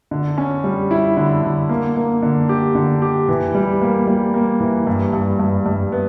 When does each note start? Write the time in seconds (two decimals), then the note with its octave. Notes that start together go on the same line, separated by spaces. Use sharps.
0.11 D3
0.38 C#4
0.64 G3
0.91 E4
1.17 D3
1.43 D3
1.69 A#3
1.96 A#3
2.22 D3
2.49 G4
2.75 D3
3.02 G4
3.28 E3
3.55 G3
3.81 A#3
4.07 G3
4.34 A#3
4.60 E3
4.87 G2
5.13 G2
5.40 G2
5.66 G2
5.92 B3